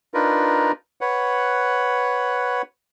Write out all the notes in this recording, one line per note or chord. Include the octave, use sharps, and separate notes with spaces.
D4 D#4 F4 A#4 B4
B4 C#5 F#5